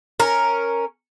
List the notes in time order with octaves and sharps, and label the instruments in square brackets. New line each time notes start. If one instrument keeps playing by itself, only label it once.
[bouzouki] C#4 A#4